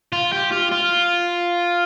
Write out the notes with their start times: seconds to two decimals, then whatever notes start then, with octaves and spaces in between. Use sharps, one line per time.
0.13 F4
0.32 G4
0.52 F4
0.72 F4